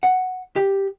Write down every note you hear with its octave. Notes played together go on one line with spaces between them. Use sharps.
F#5
G4